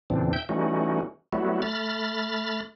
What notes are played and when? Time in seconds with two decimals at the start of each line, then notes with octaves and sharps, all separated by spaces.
0.10 E2 A#2 C#3 E3 C4 D4
0.33 E5 G5 G6
0.49 E3 G3 A3 C#4 D#4 F#4
1.33 F#3 G3 A3 B3 E4 F#4
1.62 A3 B5 F6 A6